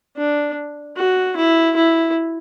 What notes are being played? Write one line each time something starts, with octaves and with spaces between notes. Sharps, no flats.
D4
F#4
E4
E4